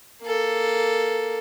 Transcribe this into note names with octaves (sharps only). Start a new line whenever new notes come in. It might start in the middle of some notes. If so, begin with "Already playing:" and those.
A#3 A4